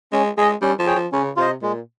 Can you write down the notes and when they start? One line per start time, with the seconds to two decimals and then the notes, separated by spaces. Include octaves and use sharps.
0.12 G#3 C#4
0.37 G#3 G#4 D#5
0.62 G3 C#4
0.79 F3
0.87 G#4 C#5 G5
0.95 F3
1.12 C#3 C#4
1.37 C3 F4 C5 D#5
1.62 A#2 G#3